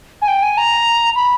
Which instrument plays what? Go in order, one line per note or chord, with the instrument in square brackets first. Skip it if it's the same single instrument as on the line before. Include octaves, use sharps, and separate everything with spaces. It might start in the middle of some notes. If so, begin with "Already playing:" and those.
[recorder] G#5
G5
G#5
A#5
B5